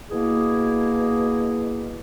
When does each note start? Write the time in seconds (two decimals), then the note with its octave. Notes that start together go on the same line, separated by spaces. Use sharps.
0.11 B2 A#3 E4 G#4